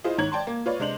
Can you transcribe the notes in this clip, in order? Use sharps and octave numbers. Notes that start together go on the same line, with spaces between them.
E4 F4 G#4 C5 D#5
G#2 D#3 C#5 A#5 G#6 F#7
D5 G5 A5 C6
A#3
F4 B4 C#5 D5
C3 G#3 D4 C5 F7 F#7